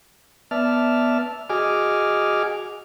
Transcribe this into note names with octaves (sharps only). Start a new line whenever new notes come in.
B3 D5 E5 A5 F6
F#4 G#4 D#5 G#5 D6 F6